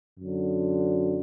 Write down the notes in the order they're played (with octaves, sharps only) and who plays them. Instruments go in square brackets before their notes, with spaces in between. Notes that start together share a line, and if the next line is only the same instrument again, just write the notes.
[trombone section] F#2 D3 F#3